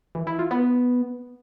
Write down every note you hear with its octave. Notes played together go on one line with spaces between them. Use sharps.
E3
E4
F4
B3